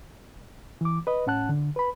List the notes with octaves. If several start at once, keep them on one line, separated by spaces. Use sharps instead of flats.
E3 D6
B4 D#5
A2 C#4 F#5 A5 F#6
D3
B4 B5